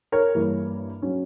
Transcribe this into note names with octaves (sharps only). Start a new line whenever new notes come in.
A#4 C#5
G2 E3 A#3
F#3 C#4